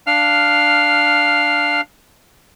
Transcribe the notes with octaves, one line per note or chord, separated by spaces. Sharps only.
D4 F5 F6